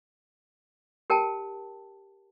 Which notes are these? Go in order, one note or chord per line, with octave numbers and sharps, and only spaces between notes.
G4 A#4 G5 A5